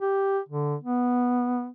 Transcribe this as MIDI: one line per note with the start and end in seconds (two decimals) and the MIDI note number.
0.01 0.39 67
0.49 0.75 50
0.83 1.68 59